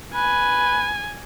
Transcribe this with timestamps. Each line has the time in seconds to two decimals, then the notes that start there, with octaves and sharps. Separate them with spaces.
0.14 B4 G#5